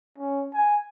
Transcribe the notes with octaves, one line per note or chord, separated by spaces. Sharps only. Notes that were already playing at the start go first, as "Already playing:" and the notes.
C#4
G#5